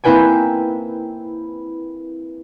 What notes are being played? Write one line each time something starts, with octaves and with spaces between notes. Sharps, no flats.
A#3 C4 E4 B4 G5 G#5